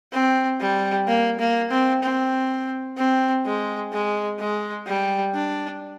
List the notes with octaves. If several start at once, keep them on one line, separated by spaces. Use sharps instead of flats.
C4
G3
A#3
A#3
C4
C4
C4
G#3
G#3
G#3
G3
D4